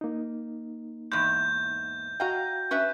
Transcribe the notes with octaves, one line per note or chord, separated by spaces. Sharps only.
A#3 D#4
E2 G#2 G6
F#4 D#5 F5 G5 A#5
C#4 B4 E5